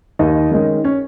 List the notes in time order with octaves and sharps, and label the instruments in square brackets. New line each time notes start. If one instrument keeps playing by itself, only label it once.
[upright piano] D#2 D#4 D#5
D#3 G#3 C#4
C#4 C#5